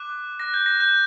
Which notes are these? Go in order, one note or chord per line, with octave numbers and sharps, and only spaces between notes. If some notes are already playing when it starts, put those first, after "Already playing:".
Already playing: D6 F#6
D6 F#6 A#6
G6
A#6
G6